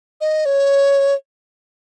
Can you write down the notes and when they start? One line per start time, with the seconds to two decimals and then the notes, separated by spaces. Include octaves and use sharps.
0.21 D#5
0.46 C#5